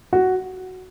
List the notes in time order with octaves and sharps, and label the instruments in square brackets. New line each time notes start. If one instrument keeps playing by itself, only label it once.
[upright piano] F#4